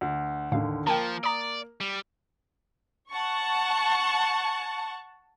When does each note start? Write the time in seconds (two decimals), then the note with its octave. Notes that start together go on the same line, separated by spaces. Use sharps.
0.01 D2
0.52 D#2 A2 D3 F5
0.87 F3 A#3 A#4 G5 A5
1.24 D5 A#5 D#6
1.81 G3
3.10 F#5 A5 C#6